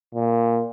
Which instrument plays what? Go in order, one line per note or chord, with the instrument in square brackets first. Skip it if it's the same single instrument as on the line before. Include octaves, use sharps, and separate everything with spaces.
[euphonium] A#2